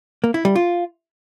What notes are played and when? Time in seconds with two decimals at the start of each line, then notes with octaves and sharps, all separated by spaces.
0.24 A#3
0.34 E4
0.45 G3
0.56 F4